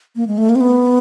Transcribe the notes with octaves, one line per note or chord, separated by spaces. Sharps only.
A#3
G#3
A3
A#3
C4
B3